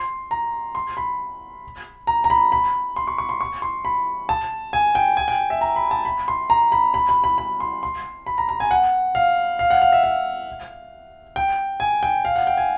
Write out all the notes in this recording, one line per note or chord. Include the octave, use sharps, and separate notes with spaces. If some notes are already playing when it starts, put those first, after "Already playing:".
Already playing: C6
A#5
C6
B5
A#5
A#5
B5
B5
C6
C#6
C#6
C6
C#6
C6
B5
A5
G#5
G5
G#5
G5
E5
A#5
B5
A5
B5
C6
A#5
B5
B5
B5
B5
B5
C6
C6
B5
A#5
A#5
G#5
F#5
F5
F5
F#5
F5
E5
F5
G5
G#5
G5
F5
F#5
G5
G#5